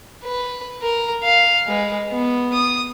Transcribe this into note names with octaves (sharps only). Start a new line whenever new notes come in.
B4
A#4
F5
G#3 B4
B3
D#6